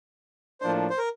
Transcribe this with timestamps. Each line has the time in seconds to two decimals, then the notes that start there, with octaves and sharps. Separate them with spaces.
0.61 A2 F3 A#3 D4 C5
0.90 C5
0.98 A#4